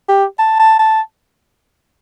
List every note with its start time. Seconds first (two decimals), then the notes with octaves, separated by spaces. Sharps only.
0.08 G4
0.39 A5
0.60 A5
0.80 A5